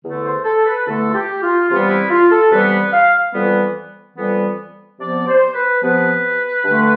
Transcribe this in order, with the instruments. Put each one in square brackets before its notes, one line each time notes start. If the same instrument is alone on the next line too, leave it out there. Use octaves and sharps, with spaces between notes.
[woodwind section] E2 D3 A3
C5
A4
B4
E2 D3 A3 A4
F4
G4
F4
C3 E3 G3 B3 F4
F4
E4
F4
A4
C3 E3 G3 B3 B4
B4
F5
F2 E3 G3 B3
F2 E3 G3 B3
C3 F3 B3 D5
C5
B4
C3 F3 B3 B4
G2 D3 A3